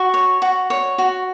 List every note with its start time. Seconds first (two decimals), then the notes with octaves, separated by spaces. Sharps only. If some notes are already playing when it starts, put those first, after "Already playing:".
Already playing: F#4 C#6
0.14 C#5
0.42 F#4
0.70 C#5
0.98 F#4